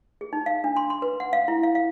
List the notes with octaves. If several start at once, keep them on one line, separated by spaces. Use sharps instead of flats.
G#4
D#4
F5
D4
C6
C6
B4
F#5
F5
E4
F5
F5